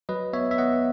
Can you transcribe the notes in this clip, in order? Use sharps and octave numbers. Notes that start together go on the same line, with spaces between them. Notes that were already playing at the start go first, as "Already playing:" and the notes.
F#3 B4 D#5
B3 C#5 E5
E5
B3 D#5 F#5